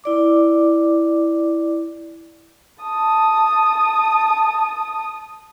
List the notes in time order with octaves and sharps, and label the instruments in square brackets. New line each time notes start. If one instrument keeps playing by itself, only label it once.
[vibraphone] E4 D5 D6
[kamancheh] A5 D#6